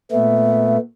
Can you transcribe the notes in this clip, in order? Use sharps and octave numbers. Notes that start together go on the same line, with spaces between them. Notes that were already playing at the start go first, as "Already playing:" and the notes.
A#2 A3 B3 E5